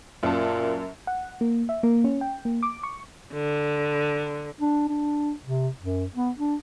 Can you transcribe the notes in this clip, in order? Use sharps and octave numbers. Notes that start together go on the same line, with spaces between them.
F#2 A#2 A#3 A5
F#5
A#3
E5
A#3
C#4
G5
A#3
D6
C#6
D3
D4
D4
C3
F#2
B3
D4